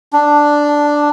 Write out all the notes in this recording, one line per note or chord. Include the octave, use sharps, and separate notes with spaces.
D4